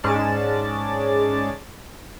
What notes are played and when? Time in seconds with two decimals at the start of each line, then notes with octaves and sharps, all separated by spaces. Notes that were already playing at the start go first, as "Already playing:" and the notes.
0.03 G#2 G#3 C#4 D5 A5 A6